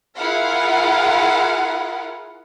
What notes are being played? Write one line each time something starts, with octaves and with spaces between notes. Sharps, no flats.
E4 F4 G#4 A#4 F5 F#5